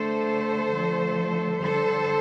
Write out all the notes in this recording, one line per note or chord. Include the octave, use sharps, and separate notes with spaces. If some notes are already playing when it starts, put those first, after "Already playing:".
Already playing: D3 A3 A4 C5
D3 F3 A3
D3 G3 A4 C5